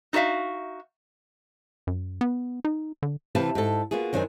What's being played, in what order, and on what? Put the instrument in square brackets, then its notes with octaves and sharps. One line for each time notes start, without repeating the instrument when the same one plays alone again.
[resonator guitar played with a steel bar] D#4 F#4 A4 E5 F5
[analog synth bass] F#2
B3
D#4
D3
[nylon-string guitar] C3 E3 G4 B4 F5 A5
G#2 A4
A#3 B3 F4 F#4 G#4
F#2 D#3 F#3 D4 C5 G#5